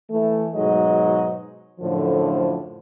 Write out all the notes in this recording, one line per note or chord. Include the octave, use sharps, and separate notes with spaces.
E3 A3
G#2 B2 F#3 G#3 D#4 D#5
F#2 A2 D3 F3